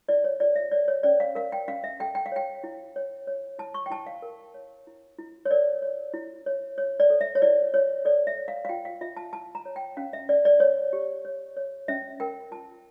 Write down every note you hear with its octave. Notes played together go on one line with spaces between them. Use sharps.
E4 D5
C#5
F4 D5
E5
C#5 D5
C#5
C#4 D5
F5
A#4 F5
G5
C#4 F5
E5
A4 G5
G5
F5
C#5 G5
E4
C#5
C#5
E4 A5
C#6
G5
E4 A5
F5
A#4
C#5
E4
E4
C#5
A#4 D5
C#5
E4
C#5
C#5
D5
A4
E5
C#5
E4 D5
E4 C#5
A4 D5
E5
C#5
F5
F5
F4 G5
F5
F4 E5
A5
E4 A5
A#5
C#5
G5
C#4 F5
E5
C#4 D5
D5
C#5
G4
C#5
C#5
C#4 E5
A#4 G5
F4 A5